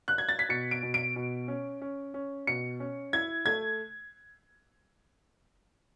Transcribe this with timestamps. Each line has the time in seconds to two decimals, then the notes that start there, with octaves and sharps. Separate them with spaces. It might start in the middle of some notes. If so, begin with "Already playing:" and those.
0.08 F#6
0.18 G#6
0.29 A6
0.39 B6
0.49 B2 C#7
0.71 D7
0.83 B2
0.94 D7
1.16 B2
1.48 C#4
1.82 C#4
2.14 C#4
2.47 B2 C#7
2.80 C#4
3.13 E4 G#6
3.46 A3 G#6